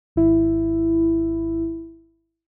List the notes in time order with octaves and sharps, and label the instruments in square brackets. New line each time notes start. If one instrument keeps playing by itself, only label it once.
[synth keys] G#1 E4